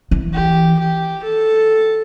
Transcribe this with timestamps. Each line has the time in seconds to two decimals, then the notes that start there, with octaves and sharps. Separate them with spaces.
0.11 E3
0.33 G4
0.79 G4
1.24 A4